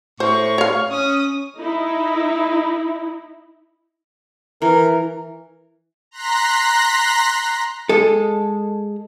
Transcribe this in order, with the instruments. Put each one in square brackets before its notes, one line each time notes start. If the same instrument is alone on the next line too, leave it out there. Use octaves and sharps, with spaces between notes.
[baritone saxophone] A2 [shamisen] C5 [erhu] C#6
[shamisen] C#5 F5
[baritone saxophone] C#4 [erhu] D#6
[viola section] D#4 E4
[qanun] E3 [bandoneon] A#4
[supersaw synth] A#5 C6 F#6 A#6 B6
[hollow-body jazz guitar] G#3 A4